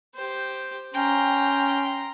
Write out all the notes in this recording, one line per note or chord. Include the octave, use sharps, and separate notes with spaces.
G4 C5
C#4 G5 A#5 C6